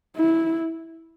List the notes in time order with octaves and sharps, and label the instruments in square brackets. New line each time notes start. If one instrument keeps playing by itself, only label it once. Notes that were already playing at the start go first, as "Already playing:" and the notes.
[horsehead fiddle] E4